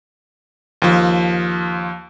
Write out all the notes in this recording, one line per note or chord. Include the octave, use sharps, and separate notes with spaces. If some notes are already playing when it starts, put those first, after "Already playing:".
D#2 F3